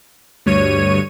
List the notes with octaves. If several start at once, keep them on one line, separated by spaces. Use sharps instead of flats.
D2 G2 C#5 D#7